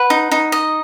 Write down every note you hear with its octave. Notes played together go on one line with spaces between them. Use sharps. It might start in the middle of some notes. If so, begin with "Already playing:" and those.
Already playing: B4 F#5 B5
D#4
D#4
D#5